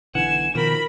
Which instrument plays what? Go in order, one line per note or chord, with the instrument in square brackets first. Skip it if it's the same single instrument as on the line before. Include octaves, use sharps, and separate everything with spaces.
[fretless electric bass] B1 D3 E3 [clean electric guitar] F#5 [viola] G#5 [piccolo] E7
[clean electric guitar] B2 D#3 [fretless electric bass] F3 [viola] A#4 B5